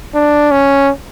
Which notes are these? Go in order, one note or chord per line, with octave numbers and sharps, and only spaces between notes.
D4
C#4